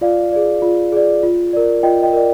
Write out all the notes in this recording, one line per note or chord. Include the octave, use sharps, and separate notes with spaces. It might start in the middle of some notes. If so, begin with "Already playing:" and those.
F4 D5 F5
G#4 D5
F4
G#4 D5
F4
A#4 D5
F4 D#5 G5
D#5 G5
A#4 D5